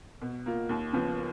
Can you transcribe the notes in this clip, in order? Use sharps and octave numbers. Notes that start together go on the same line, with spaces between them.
B2
A#3 F4
D#2
C#3 F3 B3